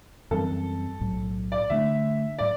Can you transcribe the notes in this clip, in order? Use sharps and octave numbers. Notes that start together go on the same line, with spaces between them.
F#2 E3 G3 C4 A4
B1 A2 F#3
D5
G2 D3 A3 D4 E5
A2 F#3 D5